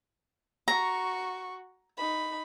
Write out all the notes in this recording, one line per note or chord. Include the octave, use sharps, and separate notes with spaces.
F#4 A#5 C#6
D#4 B5